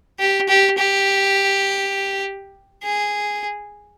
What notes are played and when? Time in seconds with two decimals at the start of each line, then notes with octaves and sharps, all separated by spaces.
0.20 G4
0.49 G4
0.78 G4
2.83 G#4